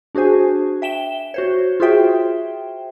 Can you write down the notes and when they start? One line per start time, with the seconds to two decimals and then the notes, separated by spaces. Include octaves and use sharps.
0.15 D4 F#4 G#4 C5 G#5
0.82 E5 G5 E7 G7
1.34 F#4 C5 C#5
1.80 F4 F#4 G#4 C5 E5 G5